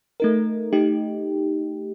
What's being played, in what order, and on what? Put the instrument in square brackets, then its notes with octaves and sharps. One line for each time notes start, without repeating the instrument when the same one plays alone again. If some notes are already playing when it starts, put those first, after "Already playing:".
[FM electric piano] A3 D#4 A#4
A3 D#4 G4